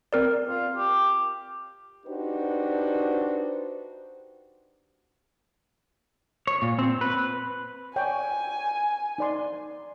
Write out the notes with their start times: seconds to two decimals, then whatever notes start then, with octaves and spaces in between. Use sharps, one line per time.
0.13 C4 A#4 D5
0.49 F4
0.77 G4
2.06 D4 D#4 F#4 G4 B4 C5
6.47 C#5
6.62 A#2
6.79 C4
7.01 B4
7.96 C#5 D5 G5 G#5
9.18 D#4 D5 C6